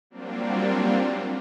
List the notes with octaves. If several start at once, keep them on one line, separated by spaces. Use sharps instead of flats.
F#3 G3 A#3 C4 D4 F4